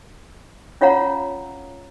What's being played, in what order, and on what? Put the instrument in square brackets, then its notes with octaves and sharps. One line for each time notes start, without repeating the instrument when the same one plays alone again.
[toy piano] C#4 F4 C#5 F5 F#5 A#5